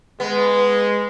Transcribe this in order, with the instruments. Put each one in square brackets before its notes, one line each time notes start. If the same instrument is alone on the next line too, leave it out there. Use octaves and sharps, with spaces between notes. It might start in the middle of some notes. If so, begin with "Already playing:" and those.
[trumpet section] G#3 [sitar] B3